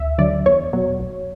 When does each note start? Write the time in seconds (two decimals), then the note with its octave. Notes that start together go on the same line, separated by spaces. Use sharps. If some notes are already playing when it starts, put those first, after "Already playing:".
Already playing: D2 E5
0.18 D3 F#3 D5
0.46 E2 C#5
0.73 B2 F#3
0.99 B1